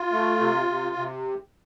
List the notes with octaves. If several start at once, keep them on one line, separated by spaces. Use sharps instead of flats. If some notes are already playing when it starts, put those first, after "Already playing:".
Already playing: F4
A3
C3
C3
C3